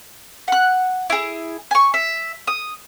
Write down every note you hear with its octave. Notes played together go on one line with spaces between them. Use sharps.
F#5 F#6
E4 G#4
G#5 C#6
E5
D#6